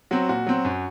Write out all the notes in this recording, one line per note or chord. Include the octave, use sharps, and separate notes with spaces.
F#3 C4 F#4
A#2 F#4
F#3 C4
F#2